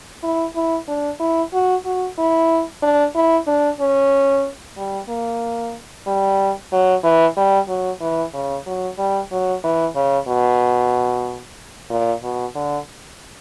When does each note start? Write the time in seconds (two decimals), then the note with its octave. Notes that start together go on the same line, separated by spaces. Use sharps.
0.23 E4
0.55 E4
0.88 D4
1.20 E4
1.53 F#4
1.85 F#4
2.18 E4
2.83 D4
3.15 E4
3.47 D4
3.80 C#4
4.77 G3
5.09 A#3
6.07 G3
6.72 F#3
7.04 E3
7.37 G3
7.68 F#3
8.01 E3
8.34 C#3
8.66 F#3
8.98 G3
9.31 F#3
9.64 E3
9.96 C#3
10.28 B2
11.90 A#2
12.23 B2
12.55 D3